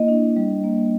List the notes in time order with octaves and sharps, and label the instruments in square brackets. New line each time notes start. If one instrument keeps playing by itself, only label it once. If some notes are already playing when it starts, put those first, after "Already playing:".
Already playing: [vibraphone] A#3 E4 D#5
D4
G3
A#3